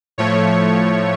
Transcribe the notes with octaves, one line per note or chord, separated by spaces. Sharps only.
A2 F3 A3 C#5